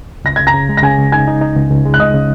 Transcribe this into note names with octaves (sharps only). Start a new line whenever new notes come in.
C#2 A#6
C#3 G#6
A#5 A#6
C#3
G#3
A#6
C#3 G#5 G#6
C#2
D#4 G#5 G#6
D#4
D#4
C#2
C#2
G#3
F#6
C#2 D#5 D#6
C#3